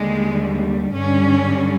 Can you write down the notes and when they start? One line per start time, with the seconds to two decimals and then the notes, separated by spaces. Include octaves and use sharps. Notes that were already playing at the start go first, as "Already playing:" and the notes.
Already playing: D#2 D3 G3 G#3
0.92 G2 D3 G3 C#4